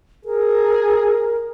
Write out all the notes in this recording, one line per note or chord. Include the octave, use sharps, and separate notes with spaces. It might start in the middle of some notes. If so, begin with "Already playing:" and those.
G#4 A#4